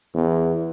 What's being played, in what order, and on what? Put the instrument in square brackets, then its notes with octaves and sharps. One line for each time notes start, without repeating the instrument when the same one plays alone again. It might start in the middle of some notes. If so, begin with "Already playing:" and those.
[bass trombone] E2